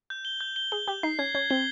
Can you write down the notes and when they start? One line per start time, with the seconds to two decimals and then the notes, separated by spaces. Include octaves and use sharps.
0.10 G6
0.25 G7
0.41 G6
0.56 G7
0.72 G#4 G7
0.88 G4 G6
1.03 D#4 C7
1.19 C#4 G#6
1.35 C#4 G#6
1.50 C4 G7